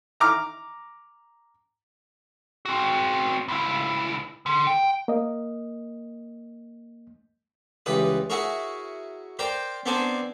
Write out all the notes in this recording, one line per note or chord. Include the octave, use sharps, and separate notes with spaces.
A#5 D6 F6
C4 F#4
C#2 E4
D3
G5
A#3 D#5
C#2 E3 G3 B4 D#6
E4 F#4 G#4 A#4 C#5
A#4 C5 D5 G5 A#5
B3 C4 D4 A#4 C5 G#5